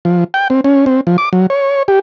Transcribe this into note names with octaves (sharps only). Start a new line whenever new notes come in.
F3
G5
C4
C#4
C4
F3
D6
F#3
C#5
G4